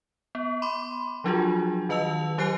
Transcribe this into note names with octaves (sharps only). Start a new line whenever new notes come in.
B3
B5 C6 D6
F3 F#3 D4 F4 F#4 G#4
D#3 B4 D#5 A5 E6 F7
F#3 G4 C5 G#5 F#6 C7